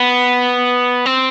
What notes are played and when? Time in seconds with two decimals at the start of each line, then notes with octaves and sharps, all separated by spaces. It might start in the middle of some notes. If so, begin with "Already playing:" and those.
Already playing: B3
1.06 C4